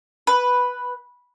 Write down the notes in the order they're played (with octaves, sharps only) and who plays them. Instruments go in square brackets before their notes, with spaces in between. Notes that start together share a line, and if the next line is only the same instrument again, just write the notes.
[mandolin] B4